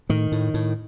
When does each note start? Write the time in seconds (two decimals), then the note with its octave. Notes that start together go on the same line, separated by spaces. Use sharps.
0.09 A2 D#3
0.32 A2
0.54 A2